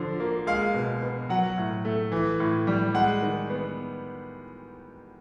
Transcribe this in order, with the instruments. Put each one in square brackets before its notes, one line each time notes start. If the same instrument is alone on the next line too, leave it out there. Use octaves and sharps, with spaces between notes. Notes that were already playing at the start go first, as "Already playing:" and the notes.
Already playing: [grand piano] D3 F3
A#3
G#3 F5
B2
B3
F#3 F#5
A2
A3
E3
A2
G3
G#3 F#5
D#3
B3